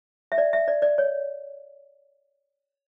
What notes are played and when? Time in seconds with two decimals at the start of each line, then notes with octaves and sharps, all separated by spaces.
0.32 E5
0.38 D5
0.53 E5
0.68 D5
0.82 D5
0.98 C#5